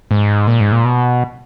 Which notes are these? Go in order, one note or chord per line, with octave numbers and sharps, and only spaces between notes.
G#2
A#2
G#2
A#2
B2